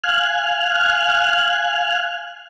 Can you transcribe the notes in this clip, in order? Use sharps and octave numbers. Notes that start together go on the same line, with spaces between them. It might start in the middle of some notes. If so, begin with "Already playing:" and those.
F5 G#5 F6 F#6